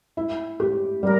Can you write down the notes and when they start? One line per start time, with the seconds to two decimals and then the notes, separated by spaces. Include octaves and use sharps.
0.17 E4
0.60 G4
1.03 G3 A#4